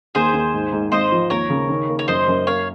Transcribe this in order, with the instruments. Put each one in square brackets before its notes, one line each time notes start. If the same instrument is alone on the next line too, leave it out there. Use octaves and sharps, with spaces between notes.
[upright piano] D#2 [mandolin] G#4 C5
[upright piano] D#2
G#2
G#2
[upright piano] G#1 [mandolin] C5 D#5
[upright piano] F3
[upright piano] D#2 [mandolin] A#4 C#5
[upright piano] C#3
D#3
A#3
[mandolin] C#5
[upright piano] F#2 [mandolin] C5 D#5
[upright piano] F#2
[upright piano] A#3 [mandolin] C#5 F5